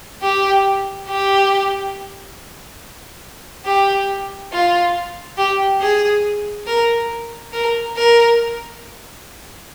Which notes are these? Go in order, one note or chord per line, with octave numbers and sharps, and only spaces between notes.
G4
G4
G4
F4
G4
G#4
A#4
A#4
A#4